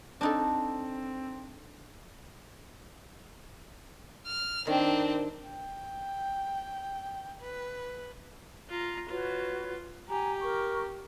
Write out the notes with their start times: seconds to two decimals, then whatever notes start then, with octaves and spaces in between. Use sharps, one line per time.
0.21 C4 D4 D#4 A4
4.26 F6
4.67 D#3 C4 D4
5.44 G5
7.41 B4
8.69 F4 A#5
9.08 F4 F#4 B4 C#5
10.08 G4 G#5 A#5
10.40 A#4 C#6